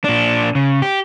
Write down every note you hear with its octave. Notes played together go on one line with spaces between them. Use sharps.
A#2 D4
C#3
G4